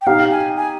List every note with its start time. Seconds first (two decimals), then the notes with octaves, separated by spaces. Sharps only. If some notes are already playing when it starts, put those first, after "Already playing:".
0.01 G5
0.07 D#4 G4 F5
0.31 G#5
0.57 G#5